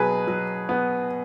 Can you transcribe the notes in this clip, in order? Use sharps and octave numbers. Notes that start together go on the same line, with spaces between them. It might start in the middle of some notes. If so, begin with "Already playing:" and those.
Already playing: B2 F#3 G#4 B4
F#3
B3